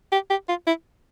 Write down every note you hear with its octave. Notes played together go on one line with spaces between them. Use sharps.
G4
G4
F4
E4